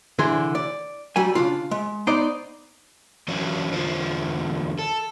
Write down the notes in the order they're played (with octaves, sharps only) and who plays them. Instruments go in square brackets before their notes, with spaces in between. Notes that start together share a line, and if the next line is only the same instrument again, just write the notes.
[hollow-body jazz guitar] C2 D3 E3 E4 G#4 C6
D5
F#3 G3 G#5
C#3 D4 F4
G#3
B3 D#4 C5 D5 D#5 A#5
[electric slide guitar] E3 F#3 C#4 D4 F#4
E2 D3 F4 C5
A4